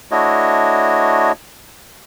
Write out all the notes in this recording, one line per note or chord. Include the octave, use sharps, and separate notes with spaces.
A3 D4 E4 F#4 C#5 D#5